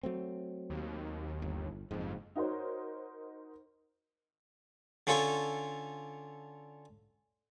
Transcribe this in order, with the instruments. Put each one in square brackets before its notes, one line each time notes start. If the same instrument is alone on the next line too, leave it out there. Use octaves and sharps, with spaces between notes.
[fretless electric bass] F#3 A3 C4
[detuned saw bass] D#2
[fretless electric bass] G1
[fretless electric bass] F#1 G#2 [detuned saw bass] F2
[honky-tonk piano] D#4 F#4 A#4 C5 C#5
[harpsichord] D3 C#4 F4 A4 C#6